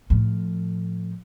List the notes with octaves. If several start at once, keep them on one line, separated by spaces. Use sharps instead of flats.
A2 F3